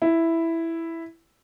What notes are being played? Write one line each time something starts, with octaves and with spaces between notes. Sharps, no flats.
E4